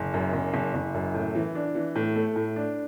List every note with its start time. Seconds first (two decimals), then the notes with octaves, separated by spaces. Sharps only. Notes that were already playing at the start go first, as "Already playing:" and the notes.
Already playing: F#1
0.14 F#2
0.33 F#1
0.54 F#1
0.74 F#1
0.94 F#2
1.14 A2
1.35 E3
1.55 D4
1.75 E3
1.95 A2
2.16 A3
2.36 A2
2.56 D4